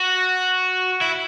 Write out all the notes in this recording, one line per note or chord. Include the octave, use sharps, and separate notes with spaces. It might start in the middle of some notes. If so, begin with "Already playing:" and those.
Already playing: F#4
E4